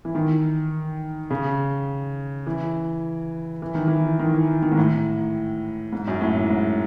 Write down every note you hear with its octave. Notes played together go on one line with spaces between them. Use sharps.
E3
D#3
C#3
E3
E3
D#3
E3
D#3
E3
D#3
G#2
A2
G#2
F#2
A2
G#2
G#2